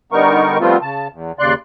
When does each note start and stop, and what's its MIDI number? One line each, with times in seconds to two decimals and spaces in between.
0.12 0.58 50
0.12 0.58 55
0.12 0.58 59
0.12 0.58 63
0.12 0.58 70
0.12 0.58 85
0.60 0.77 53
0.60 0.77 55
0.60 0.77 57
0.60 0.77 59
0.60 0.77 60
0.60 0.77 65
0.82 1.08 49
0.82 1.08 81
1.13 1.32 40
1.39 1.54 39
1.39 1.54 49
1.39 1.54 74
1.39 1.54 84
1.39 1.54 90